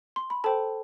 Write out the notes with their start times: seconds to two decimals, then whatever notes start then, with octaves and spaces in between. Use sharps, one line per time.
0.16 C6
0.30 B5
0.44 A4 C5 G5 A5